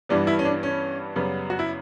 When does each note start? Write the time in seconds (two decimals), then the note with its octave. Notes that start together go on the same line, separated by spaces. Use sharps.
0.09 G2 E3 G3 B3 D4
0.27 E4
0.39 C#4
0.45 D4
0.63 C#4
1.16 F#2 C#3 G3 B3
1.50 F#4
1.59 E4